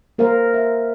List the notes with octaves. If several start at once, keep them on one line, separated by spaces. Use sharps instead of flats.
A#3 A#4 C5 F5
E5